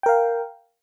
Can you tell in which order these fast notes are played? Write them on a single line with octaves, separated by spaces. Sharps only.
G5 A#4 F5